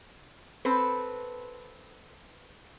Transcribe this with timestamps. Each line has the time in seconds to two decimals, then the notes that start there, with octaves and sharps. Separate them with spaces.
0.65 C4 A4 B4